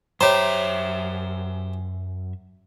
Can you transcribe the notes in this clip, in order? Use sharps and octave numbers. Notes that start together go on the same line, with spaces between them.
F#2 G4 C5 C#5 E5 A#5 B5